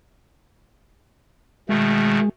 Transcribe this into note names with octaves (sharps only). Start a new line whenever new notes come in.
B2 D#3 G#3 A3